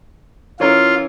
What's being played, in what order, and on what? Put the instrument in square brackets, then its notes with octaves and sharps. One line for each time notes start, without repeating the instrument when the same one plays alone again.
[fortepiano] E3 C#4 A#4 [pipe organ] F4